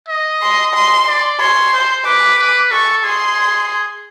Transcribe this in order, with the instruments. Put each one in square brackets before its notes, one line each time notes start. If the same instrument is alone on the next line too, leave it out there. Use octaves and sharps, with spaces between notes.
[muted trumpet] D#5
[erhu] C6
C6
[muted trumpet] D5
[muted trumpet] C#5 [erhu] C6
[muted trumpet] C5
[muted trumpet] B4 [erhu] D6
[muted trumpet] B4
[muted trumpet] A4 [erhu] C#6
[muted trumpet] G#4 [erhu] C6